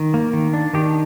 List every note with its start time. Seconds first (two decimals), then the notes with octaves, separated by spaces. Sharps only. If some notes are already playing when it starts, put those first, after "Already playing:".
Already playing: D#3
0.14 A#3
0.33 D#3
0.53 D4
0.74 D#3 G4